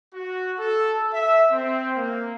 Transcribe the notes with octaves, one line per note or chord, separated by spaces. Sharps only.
F#4
A4
E5
C4
A#3